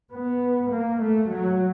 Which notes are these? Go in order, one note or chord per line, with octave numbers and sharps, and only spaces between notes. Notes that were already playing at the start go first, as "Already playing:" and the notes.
B3
A#3
A3
F#3